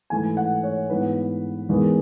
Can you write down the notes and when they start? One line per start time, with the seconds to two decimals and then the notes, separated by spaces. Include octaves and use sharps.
0.10 G#2 E3 A3 G#5
0.37 F#5
0.63 C#5
0.90 G#2 E3 B3 B4
1.69 E2 D#3 G#3 B3